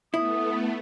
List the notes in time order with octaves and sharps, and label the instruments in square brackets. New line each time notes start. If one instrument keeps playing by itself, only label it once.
[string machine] A3 B3 [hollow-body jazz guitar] E4 [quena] D#6